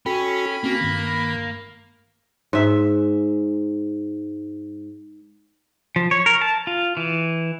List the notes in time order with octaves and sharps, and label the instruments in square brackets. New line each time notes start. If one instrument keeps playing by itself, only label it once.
[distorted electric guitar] C#4 [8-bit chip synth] F#4 A4 G5 [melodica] B5
[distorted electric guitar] A#3 [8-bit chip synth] C4 C#4 F#4
[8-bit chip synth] G2 D#3
[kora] G#2 E5
[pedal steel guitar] F3
C#5
A#4
A5
F4
E3